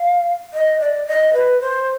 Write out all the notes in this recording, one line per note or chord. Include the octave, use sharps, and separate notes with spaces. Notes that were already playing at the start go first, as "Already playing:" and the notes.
Already playing: F5
D#5
D5
D#5
B4
C5